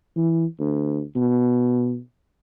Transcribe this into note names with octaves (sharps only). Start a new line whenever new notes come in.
E3
D2
B2